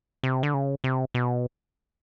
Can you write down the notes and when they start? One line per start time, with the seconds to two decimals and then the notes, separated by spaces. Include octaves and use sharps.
0.23 C3
0.43 D3
0.54 C#3
0.84 C3
1.14 B2